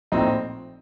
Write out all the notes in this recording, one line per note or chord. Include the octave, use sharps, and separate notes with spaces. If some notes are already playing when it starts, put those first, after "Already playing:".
A#1 A2 F3 C4 D#4